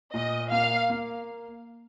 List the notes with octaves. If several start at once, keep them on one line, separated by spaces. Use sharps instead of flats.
A#2 D#5
A#3 F5
A#3